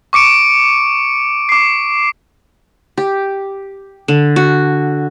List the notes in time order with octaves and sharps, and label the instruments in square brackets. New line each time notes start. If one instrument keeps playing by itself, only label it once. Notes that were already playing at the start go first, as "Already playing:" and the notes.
[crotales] C#6 D6 C#7 D7
D6 C7
[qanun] G4
D3
F#4